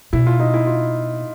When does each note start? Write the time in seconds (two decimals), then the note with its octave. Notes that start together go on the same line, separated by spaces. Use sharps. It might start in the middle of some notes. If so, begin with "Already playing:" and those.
0.13 B2 E4
0.27 F4
0.39 D#4
0.54 E4
0.67 F4